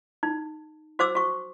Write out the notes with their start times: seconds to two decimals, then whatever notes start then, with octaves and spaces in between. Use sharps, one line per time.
0.23 D#4
0.99 F#4 C5 D6 E6
1.15 F#4 C#6